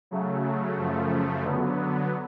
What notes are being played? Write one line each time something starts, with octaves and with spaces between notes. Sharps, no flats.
C#3 F#3 A3
F#2 C#3 F3 A3
D3 F#3 B3